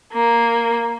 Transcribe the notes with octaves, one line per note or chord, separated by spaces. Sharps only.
A#3